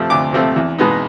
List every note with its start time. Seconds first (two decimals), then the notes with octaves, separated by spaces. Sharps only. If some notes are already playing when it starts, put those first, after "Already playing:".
Already playing: C3 F3 A3 C4
0.10 D2 D6
0.33 C3 F3 A3 C4
0.56 E2
0.79 B2 G#3 B3 D#4